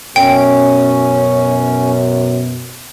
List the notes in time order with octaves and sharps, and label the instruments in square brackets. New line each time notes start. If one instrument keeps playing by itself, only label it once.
[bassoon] F#2 [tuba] B2 [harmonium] C#4 [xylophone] G5